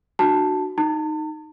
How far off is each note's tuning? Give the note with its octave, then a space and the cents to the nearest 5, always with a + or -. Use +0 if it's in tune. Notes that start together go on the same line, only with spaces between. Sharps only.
D4 +40 F#4 +0 A5 +0
D#4 +0 A5 +40